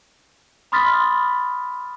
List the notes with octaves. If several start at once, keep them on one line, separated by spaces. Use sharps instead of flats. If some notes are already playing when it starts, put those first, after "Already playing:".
B5 C6 D#6 F6 A6 B6